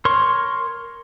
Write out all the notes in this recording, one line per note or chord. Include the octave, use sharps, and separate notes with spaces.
A#4 C#5 C6 C#6